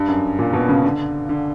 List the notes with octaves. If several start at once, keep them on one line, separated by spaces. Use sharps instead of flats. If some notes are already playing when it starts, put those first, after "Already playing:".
Already playing: G2
F#2
A#2
B2
C#3
D3
D3